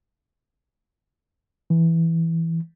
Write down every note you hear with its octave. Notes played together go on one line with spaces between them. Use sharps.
E3